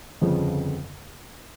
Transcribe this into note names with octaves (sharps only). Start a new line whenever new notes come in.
G1 F2 C#3 F3